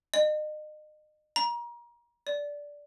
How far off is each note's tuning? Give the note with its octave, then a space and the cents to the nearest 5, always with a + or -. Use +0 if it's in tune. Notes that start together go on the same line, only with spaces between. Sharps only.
D#5 -35
A#5 +30
D5 -10